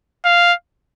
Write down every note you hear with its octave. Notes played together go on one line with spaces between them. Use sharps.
F5